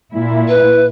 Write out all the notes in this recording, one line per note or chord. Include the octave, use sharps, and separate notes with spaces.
A#2 E4
B4